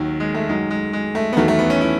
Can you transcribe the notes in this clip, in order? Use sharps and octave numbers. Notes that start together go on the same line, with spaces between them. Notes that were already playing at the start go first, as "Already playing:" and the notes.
Already playing: D#2 D#3 F#3
G#3
A3
F#2 D#3 F#3 G#3
G#3
G#3
A3
B3
E2 D#3 F#3 A3
A3
B3
C#4
E4